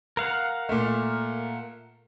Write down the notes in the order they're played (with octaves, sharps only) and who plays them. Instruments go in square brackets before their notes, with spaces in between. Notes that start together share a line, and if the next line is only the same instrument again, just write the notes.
[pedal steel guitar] A#4 F5 F#5
[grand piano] A#2 A3